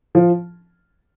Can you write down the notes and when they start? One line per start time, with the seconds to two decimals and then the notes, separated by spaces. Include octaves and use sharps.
0.15 F3